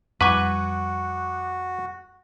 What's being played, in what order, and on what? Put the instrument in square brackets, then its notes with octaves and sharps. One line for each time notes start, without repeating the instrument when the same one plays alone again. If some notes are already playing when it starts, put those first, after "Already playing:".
[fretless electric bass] F2 G3 [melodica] F#4 [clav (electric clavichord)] B4 G#5 [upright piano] F#5 C#6 D6